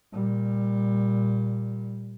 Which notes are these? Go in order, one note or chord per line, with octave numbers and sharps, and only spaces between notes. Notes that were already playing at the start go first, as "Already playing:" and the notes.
A#2 G3